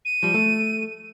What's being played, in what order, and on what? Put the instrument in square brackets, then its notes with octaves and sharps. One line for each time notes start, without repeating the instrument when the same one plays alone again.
[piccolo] D#7
[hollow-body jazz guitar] F3 G3
A3